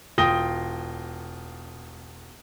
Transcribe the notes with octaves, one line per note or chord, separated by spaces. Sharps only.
E1 F4 G5 D#6 A#6 G7